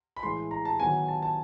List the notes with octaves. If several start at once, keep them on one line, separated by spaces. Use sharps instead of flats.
B5
A2 E3 G#3 C6
A#5
A5
D#3 F#3 B3 G#5
A5
A5